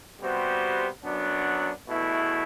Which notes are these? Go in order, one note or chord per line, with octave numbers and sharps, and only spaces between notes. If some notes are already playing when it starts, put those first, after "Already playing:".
C3 G3 B3 F#4 C5
F#2 F#3 B3 D4
E2 B2 A3 E4